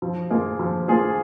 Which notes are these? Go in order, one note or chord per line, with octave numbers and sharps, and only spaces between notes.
F3
A#3 F4 G#4
F3
A#3 F4 G#4